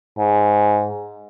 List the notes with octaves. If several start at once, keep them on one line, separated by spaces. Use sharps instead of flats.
G#2